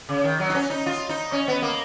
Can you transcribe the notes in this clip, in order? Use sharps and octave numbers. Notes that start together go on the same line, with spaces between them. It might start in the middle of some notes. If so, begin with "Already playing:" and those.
C#3
D#3
F#3
D#4
C#4
D#4
F4
D#4
C#4
B3
A#3